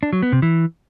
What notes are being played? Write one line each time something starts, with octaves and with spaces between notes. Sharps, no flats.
D4
F#3
B3
C3
E3